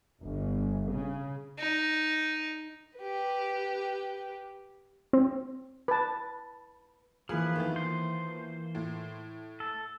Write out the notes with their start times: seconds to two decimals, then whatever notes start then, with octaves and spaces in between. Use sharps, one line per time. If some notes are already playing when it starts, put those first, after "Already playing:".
0.23 G1
0.91 C#3
1.59 D#4
2.98 G4 B4
5.13 C4
5.88 B4 A5
7.29 E3 F3 A#3 F4 G#4 B4
7.56 D#3 A3 B3
7.76 C5
8.75 A2
9.60 A4